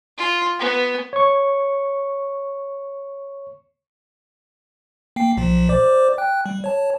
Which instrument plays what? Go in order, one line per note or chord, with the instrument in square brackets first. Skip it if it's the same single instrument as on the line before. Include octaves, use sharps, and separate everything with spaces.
[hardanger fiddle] F4
B3
[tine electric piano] C#5 C#6
[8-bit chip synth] A#3 G5 C7
B1 A#2 F3
C5 D5 D6
G5 F#6
G3
C#5 A5